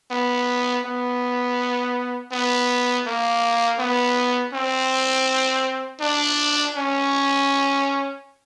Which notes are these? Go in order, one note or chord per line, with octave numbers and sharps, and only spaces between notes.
B3
B3
B3
A#3
B3
C4
D4
C#4